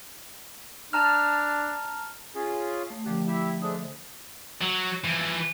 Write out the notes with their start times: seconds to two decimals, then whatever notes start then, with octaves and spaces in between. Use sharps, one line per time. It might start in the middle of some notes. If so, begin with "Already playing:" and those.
0.93 D4 A5 A#5 F6
2.35 C#4 F4 G#4
2.90 A3
3.06 F#2 D3 F3 A3 G4
3.27 E4 G4 E5
3.62 G#3 A3 D4 C5 D#6
4.61 F#3
5.04 E3 F3